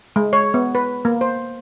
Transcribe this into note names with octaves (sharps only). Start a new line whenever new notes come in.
G#3
C#5
B3
B4
A#3
C5